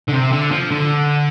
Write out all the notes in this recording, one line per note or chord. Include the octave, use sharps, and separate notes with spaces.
D3
C3
D3
F3
D3